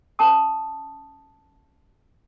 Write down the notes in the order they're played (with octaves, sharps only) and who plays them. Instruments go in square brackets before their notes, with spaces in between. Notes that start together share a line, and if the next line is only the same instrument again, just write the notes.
[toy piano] C#4 A5 D#6